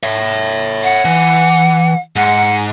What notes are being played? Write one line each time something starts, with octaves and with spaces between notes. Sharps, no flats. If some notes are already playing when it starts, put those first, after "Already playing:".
C#5 E5
F#5
E3
G#2 F#5